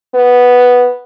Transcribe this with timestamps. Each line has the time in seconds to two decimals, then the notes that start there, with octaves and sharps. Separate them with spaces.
0.14 B3